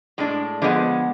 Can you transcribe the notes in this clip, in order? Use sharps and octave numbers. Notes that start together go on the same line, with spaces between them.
A2 G#3 D4
D3 F3 G#3 B3